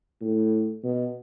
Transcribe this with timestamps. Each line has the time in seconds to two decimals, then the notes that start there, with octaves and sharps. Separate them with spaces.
0.21 A2
0.84 B2